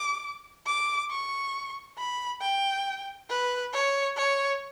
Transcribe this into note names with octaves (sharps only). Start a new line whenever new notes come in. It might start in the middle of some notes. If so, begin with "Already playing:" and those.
Already playing: D6
D6
C#6
B5
G5
B4
C#5
C#5